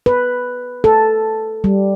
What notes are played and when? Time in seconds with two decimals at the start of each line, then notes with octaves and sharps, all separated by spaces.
0.06 B4
0.84 A4
1.64 G3